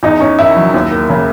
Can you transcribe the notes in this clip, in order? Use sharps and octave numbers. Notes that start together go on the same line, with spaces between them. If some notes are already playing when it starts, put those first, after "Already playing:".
E2 D#4
C#4
D#3 E4
F#3
D#2
A#3
C#3